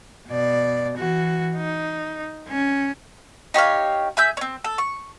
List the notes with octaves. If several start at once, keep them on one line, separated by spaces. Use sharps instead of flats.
B2 D5
E3 F#4
D#4
C#4
D#4 G4 C#5 F5
G#4 E5 E6 G6
C4 C#4
A4
C#6